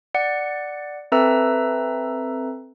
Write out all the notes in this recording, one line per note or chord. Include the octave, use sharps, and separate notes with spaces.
D5 F#5 C#7
C4 A4 B4 E5 A#5 E6